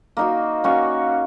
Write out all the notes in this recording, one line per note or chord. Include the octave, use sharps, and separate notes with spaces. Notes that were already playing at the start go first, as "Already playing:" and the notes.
A#3 D#4 F#4
A#3 C#4 F#4 C#5